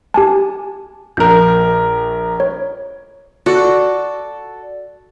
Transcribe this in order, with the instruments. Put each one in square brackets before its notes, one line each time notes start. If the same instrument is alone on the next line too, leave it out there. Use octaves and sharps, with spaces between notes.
[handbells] G4 G#5 A5
[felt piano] A#1 A#4 [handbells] G6
[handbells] C#5
[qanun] F#4 [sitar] A4 D5